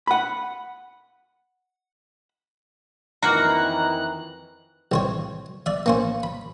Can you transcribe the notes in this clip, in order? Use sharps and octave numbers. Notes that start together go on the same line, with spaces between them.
F#5 B5
F2 D#3 E3 A#3 F#4 A#5 F#6
C2 C5 C#5
D5 E5
A#3 C#4 C5
B5